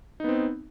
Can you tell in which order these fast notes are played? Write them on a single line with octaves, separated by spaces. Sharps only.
D#4 B3 C4